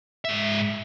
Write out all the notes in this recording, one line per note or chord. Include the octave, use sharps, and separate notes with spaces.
G#2 E5